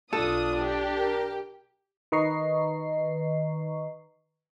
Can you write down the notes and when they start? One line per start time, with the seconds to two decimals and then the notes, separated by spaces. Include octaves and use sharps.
0.13 B1 D4 F4 A4 D#6
0.61 G4
0.97 A#4
2.12 D#3 B4 D#5 A#5 C#6 C7